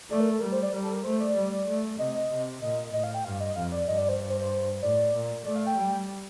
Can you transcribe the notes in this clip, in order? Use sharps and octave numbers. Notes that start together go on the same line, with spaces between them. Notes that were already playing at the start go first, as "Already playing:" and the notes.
A3 D5
A#4
A4
G3 A#4
C5
D5
G3 A#4
A4
A#4
A3 C5
D5
G3
A3
C3 D#5
C3
A#2 D#5
A2 D#5
F5
G5
G2 F5
D#5
F2 F5
D5
G2 D#5
D5
C5
C5
C5
A2 D5
A#2
A3 D5
F5
G5
G3